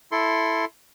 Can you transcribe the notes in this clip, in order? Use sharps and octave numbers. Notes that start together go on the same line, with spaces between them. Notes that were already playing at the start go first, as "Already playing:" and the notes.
E4 A4 C6